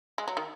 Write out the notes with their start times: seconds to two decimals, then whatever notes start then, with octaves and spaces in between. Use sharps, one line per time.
0.18 G#3
0.28 F#3
0.37 D#3